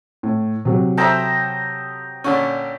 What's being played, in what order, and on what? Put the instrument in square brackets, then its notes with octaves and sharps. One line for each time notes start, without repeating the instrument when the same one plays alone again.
[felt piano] A2
C3 F#3
[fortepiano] A4 C5 E5 [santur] G5 A#5 D#6
[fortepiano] A#2 D3 C#4 [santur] C#6